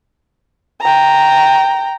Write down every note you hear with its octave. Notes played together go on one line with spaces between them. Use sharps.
G5 A#5